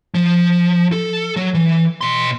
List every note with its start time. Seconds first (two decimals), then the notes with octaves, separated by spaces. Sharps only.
0.14 F3
0.92 A4
1.36 F#3
1.54 E3
2.01 B2 C6